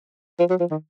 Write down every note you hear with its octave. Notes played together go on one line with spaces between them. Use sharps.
F3
F#3
F3
D#3